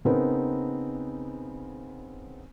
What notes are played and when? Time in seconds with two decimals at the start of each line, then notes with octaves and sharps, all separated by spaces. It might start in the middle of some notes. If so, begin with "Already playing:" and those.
0.05 C#3 B3 C4 D#4 A#4 B4